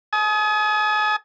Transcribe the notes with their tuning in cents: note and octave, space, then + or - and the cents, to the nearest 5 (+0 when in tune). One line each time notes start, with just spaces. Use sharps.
G#5 +45 D#6 +25